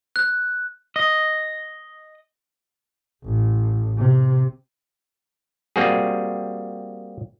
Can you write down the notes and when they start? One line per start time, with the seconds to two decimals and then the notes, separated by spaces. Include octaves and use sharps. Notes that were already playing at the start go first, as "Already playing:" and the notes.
0.16 F#6
0.96 D#5
3.24 A1
3.98 C3
5.76 G3 A#3 C4 F#4 G#4